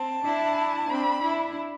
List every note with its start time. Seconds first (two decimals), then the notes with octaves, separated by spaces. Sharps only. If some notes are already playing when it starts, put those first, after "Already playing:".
Already playing: C4 A5
0.25 D4 E4
0.89 C4 D4 B5
1.21 D4 E4